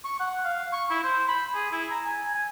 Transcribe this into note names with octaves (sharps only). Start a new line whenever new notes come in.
C#6
F#5
F5
C#6
E4
C5
B5
G#4
E4
A#5
G#5
G#5